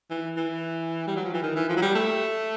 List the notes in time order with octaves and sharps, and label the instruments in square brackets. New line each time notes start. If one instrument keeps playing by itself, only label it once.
[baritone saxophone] E3
E3
G3
F#3
F3
E3
D#3
E3
F3
F#3
G3
A3